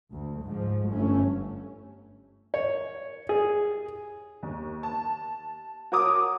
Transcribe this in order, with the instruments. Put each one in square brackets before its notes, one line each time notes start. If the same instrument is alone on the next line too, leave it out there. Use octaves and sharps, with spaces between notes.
[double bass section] D2
G#2 F3
G1 A3 C#4
[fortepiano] C#5
G#4
[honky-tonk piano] D#2
A5
F#4 A#4 C#5 D6 D#6